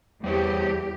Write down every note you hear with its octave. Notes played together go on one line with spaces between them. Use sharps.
E2 G3 G4 C5 C#5